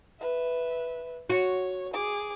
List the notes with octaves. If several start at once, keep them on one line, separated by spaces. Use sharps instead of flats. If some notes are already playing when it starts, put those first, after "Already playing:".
B4 E5
F#4 C#5
G#4 D6